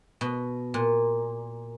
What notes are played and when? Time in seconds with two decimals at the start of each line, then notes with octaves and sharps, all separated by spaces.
0.21 B2
0.74 A#2